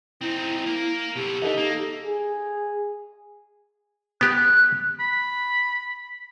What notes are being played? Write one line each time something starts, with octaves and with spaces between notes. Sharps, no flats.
C4 D#4 E4
A#3 A#4
B2 G4 A4
E3 D#4 A4 D#5
A#3
G#4
B3 G4 F#6
B5